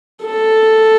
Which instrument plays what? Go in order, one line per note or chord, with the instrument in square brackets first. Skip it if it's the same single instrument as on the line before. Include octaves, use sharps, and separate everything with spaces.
[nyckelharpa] A4